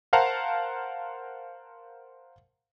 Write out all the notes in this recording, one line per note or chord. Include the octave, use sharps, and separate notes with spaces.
A#4 C5 F5 F#5 A5 A#5